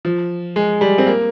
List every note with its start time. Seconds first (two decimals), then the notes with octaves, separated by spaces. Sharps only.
0.05 F3
0.56 G#3
0.81 G3
0.98 C4
1.07 A#3